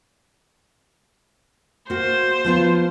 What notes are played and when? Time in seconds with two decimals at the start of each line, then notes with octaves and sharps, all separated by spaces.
1.90 A#3 F#4 C5
2.44 F3 B3 F4